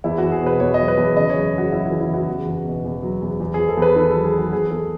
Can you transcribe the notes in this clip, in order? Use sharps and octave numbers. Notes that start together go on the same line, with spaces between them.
E2 E4
E2 F#4
G#4
B2 B4
E2 C#5
F#3 D#5
B4
E2
C#3 D#5
C#5
F#2
F#2 F#4
F#2 E4
F#4
E3
E4
C#3 F#4
E2
E2
B2
E2
F#3
E2
E2
G#4
E2
A4
E2 B4
D#3 A4
F#3 A4
G#4
F#3 F#4
E2 G#4
E2 A4